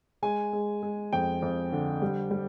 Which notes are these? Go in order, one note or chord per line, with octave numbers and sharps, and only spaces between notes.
G#3 G#5
G#3
G#3
F2 G5
F2
D3
G3
G3